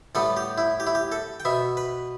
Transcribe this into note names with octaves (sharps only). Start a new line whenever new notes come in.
A2 G3 B3 A4
G4
E4
G4
E4
G4
A4
G5
B2 B3 E5
B4